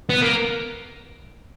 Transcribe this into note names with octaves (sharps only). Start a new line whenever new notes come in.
B3
A#3